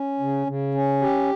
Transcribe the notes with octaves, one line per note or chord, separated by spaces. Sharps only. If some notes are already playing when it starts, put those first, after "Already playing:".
Already playing: C#4
C#3
C#3
C#4
G4